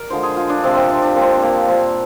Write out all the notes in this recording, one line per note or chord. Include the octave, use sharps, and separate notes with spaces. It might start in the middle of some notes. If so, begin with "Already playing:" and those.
Already playing: A#4 D5
D3 F3 G#3 C5
G#4
F4
D4
C3 F3 G#3 C4
C4
D4
D4
A#2 G#3 C4
A#3
A#2 G3 C4